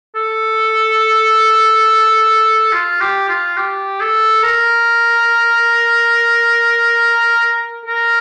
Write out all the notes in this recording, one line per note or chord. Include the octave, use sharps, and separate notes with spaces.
A4
F4
G4
F4
G4
A4
A#4
A#4